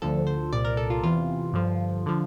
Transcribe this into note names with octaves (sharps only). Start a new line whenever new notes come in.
D2 D3 F3 A4
C5
C2 A#2 F3 D5
A#4
A4
F4
E2 C3 E3 F4
G2 D3 F3
D3 F3